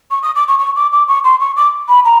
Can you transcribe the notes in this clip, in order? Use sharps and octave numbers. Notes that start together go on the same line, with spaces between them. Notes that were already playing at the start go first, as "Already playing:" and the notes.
C#6
D#6
D6
C#6
C#6
D6
D6
C#6
C6
C#6
D6
B5
A#5